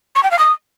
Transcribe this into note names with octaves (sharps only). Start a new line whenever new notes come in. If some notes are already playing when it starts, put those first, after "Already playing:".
C#6
G5
F5
D#6